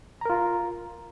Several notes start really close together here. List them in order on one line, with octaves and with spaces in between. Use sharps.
A#5 A#4 F4